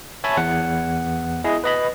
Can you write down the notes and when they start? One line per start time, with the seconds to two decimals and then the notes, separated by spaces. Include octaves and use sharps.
0.24 C#5 E5 G#5 A5 B5
0.37 E2 F#5
1.44 E4 G#4 D#5
1.64 B4 D#5 B5